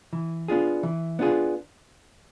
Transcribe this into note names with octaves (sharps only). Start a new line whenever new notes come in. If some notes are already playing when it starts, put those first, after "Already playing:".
E3
B3 D4 F4 G#4
E3
B3 D4 F4 G#4